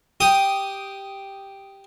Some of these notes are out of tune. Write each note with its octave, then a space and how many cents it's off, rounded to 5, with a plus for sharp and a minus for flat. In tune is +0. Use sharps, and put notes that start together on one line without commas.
G4 +0 D#6 +0